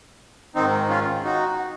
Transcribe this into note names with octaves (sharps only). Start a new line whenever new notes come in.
G#2 D#3 C4 D#4
C#4 F4
D#4 F#4